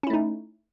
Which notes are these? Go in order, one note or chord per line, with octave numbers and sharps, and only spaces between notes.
A3 C#4 D#4 E4